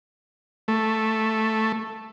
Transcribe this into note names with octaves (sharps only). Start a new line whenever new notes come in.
A3